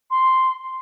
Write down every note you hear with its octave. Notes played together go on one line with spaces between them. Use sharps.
C6